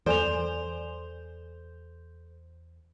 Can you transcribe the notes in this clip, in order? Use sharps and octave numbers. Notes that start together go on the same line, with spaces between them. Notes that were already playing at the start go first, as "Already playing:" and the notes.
E2 A4 C5 D5 G#5 F7